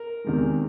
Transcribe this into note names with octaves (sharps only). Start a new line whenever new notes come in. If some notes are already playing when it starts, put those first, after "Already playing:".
Already playing: A#4
E2 C3 D#3 G#3